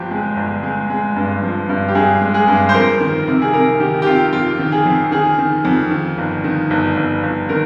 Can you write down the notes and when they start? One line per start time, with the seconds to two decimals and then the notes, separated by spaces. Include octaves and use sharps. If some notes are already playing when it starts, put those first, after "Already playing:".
Already playing: G1 F3 G4
0.11 G#3
0.37 G1
0.63 G#3
0.90 G#3
1.16 G2
1.42 F3
1.69 G2
1.88 G4
1.95 G2 G#4
2.21 G#3
2.34 G#4
2.48 G2
2.69 C5
2.74 F2 A#4
3.00 D#3
3.27 C3
3.42 G#4
3.54 C3 A#4
3.80 D#3 G4
4.02 G4
4.06 C3 F4
4.33 F2 F4
4.59 D#3
4.72 G#4
4.86 F2
5.12 D#3 G#4
5.38 D#3
5.65 F2
5.91 D#3
6.18 G1
6.44 D#3
6.70 G1
6.97 G1
7.23 G1
7.49 D#3 A#4